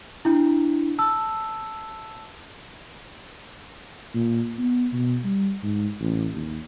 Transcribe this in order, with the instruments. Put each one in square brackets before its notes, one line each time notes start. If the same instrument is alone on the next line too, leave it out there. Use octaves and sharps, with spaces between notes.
[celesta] D4 E4
A5 E6
[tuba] A#2
B3
B2
G3
G#2
A1
D#2